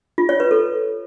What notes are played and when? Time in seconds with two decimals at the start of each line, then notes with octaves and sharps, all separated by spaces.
0.18 F4
0.29 C#5
0.40 B4
0.51 A4